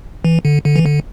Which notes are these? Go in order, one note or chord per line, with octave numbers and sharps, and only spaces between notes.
E3
D3
D3
E3
D3